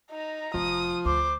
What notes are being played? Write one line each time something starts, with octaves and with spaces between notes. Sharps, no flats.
D#4 A#5
F1 F3 D#6
D2 C5 D6